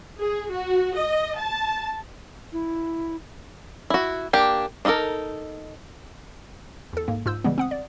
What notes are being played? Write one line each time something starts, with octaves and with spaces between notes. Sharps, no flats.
G#4
F#4
D#5
A5
E4
E4 F#4
A#3 D4 G4 G5
D4 D#4 F4 A4 A#4
E2 A4
G#2 A#3
G#2 F4 E6 G6
C#3 E3 G3 G#3 B3
C4 F#5 D#6
D5